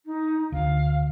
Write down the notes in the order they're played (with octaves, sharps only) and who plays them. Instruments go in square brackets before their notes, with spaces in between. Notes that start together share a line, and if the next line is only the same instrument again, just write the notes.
[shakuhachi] D#4
[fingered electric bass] D2 [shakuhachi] F5